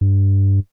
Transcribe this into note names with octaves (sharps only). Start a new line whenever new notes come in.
G2